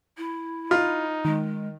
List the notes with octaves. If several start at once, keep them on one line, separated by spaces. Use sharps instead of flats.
E4
D#4 F4
D#3 G#3